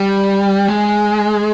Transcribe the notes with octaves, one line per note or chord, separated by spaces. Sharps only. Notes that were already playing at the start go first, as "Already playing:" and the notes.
Already playing: G3
G#3